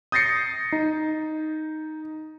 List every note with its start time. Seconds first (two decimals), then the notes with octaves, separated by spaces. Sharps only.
0.12 D#6 G6 A6 A#6 C7 C#7
0.72 D#4